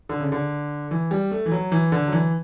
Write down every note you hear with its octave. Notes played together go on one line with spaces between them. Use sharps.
D3
C#3
D3
E3
G3
A3
E3
F#3
E3
D3
F#3
E3